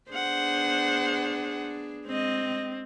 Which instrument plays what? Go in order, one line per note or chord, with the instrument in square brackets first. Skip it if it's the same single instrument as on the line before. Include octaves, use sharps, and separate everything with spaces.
[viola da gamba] B3 D4 G#4 [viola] C5 F#5
[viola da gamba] G#3 D#5 [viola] C4